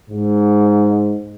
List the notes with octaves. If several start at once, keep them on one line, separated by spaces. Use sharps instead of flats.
G#2